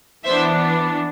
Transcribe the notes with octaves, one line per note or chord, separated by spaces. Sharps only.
E3 B3 D4 C5 E5